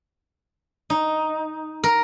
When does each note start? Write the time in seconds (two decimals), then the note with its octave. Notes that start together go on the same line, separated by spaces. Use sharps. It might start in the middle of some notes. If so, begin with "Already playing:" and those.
0.90 D#4
1.84 A#4